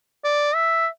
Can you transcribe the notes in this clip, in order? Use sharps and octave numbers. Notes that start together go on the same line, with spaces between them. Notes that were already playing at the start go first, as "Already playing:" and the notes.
D5
E5